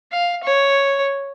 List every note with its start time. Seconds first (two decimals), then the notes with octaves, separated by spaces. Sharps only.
0.12 F5
0.43 C#5